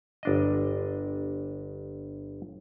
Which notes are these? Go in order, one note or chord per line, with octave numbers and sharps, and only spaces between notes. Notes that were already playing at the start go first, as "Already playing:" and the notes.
G1 D4 D#5